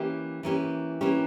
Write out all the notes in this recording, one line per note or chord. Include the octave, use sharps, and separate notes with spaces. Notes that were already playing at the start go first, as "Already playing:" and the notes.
Already playing: E3 A#3 C#4 G4
E3 A#3 C#4 G4
E3 A#3 C#4 G4